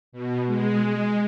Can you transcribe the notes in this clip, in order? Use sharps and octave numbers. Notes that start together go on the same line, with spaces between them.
B2
G#3